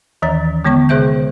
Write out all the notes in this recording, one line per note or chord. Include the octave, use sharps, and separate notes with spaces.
D#2 D#3 E3 C#5 A#5 A6
D3 G#3 B3 C#5 C#6
C3 G#4 C5 E5 G6